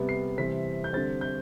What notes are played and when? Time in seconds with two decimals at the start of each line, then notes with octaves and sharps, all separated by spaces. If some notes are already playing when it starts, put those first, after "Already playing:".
Already playing: C3 G3 B3
0.09 C7
0.38 C3 E3 G3 C4 B6
0.84 G6
0.93 D3 G3 C4 A6
1.21 G6